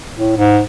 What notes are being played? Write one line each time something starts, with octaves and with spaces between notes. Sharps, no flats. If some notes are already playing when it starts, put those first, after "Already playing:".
A2
G#2